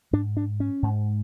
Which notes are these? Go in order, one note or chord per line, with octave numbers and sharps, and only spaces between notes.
G#2 D4
D4
C#4
G#2